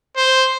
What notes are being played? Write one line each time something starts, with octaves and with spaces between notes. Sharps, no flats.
C5